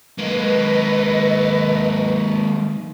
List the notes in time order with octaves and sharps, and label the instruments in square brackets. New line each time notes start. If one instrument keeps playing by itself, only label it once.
[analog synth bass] D#3 [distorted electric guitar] G#3 A#3 [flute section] B4 D#5